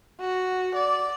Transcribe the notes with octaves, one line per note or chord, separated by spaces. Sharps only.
F#4
D5